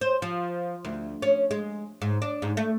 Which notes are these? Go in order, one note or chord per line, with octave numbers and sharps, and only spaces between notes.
C5
F3
D2
C#4
G#3
G#2
D4
G#2
A3